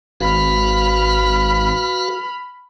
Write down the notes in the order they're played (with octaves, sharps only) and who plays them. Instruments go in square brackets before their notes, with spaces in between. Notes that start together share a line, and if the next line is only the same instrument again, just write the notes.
[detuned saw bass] G#1 [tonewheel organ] F#4 B4 F5 [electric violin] B5 F6